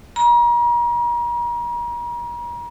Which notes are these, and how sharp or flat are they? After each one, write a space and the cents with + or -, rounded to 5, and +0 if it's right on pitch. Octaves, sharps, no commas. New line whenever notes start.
A#5 +40